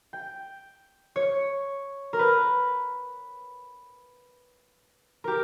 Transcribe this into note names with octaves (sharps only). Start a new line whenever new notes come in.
G5
C#5
A#4
B4
G4 A#4